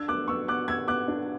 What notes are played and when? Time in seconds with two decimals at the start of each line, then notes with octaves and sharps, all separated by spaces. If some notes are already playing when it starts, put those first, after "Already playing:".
Already playing: D4 E6 G#6
0.08 B3 D6 F#6
0.28 B3 C#6 E6
0.48 B3 D6 F#6
0.68 B3 E6 G#6
0.88 B3 D6 F#6
1.08 D4